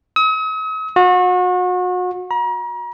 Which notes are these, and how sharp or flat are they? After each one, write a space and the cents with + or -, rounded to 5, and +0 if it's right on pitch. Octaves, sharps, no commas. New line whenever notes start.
D#6 +45
F#4 -35
A#5 +40